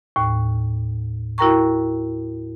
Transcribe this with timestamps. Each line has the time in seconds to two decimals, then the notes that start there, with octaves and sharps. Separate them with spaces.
0.16 D#2 A2
1.38 E4 F#4 A#4 G5 A#5 C#6